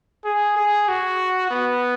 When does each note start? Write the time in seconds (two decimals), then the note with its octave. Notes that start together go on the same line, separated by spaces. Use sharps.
0.25 G#4
0.57 G#4
0.89 F#4
1.51 B3